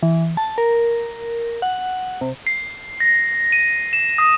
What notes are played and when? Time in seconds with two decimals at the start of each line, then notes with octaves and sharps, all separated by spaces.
0.03 E3
0.37 A5
0.58 A#4
1.62 F#5
2.21 C3
2.47 C7
3.00 A#6
3.52 D#7
3.93 E7
4.18 D#6